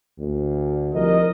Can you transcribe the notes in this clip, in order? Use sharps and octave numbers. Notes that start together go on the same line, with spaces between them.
D2
C2 F3 A#4 D#5